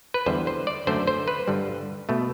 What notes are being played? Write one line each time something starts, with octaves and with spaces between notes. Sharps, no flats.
B4
E2 D3 G3 C5
C5
D5
F#2 D3 A3 C5
C5
B4
G2 D3 G3
B2 A3